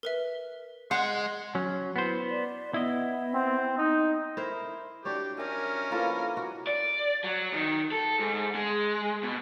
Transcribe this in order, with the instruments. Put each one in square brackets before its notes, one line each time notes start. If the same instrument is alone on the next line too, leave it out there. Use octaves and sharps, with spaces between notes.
[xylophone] A#4 B4 E5
[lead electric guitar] G#3 [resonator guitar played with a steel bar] F#5 [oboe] C6 [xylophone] G6
[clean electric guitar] F#3 C#4
[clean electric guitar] B3 C5 [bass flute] E4
[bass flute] D5
[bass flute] B3 [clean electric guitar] E4 D#5
[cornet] C4
D#4
[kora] E4 A#4 C5
[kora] D4 F#4 C#5 [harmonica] G4
[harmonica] C#4 A#4 [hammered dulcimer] D#5 E5 G#5
[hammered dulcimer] F3 A#3 E4 [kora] F4 A4 B4
[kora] F#4
[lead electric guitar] D5
F#3
D#3
A4
G#2
G#3
B2